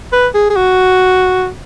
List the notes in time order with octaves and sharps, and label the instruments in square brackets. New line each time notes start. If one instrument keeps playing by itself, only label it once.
[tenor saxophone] B4
G#4
G#4
F#4